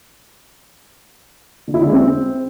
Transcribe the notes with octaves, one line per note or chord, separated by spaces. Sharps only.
D3
E4
D3
G#3
C4